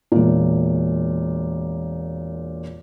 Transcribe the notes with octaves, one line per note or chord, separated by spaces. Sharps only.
E1 A#2